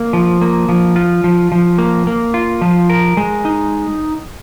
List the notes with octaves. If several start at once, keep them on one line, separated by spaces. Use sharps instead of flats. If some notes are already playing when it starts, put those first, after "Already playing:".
Already playing: A#3
F3
A#3
F3
F4
F3
F3
A#3
A#3
F4
F3
A#4
G#3
D#4